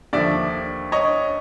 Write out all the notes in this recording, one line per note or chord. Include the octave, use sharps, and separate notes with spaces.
D#2 D3 F3 D5 E5
C#5 D#5